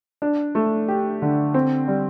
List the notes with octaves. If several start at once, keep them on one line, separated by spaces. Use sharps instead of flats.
D4
A3
G4
D3
C4
G3